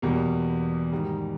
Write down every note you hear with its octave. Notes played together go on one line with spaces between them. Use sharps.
E2 B2 G3 A#3
G#2 D#3 G3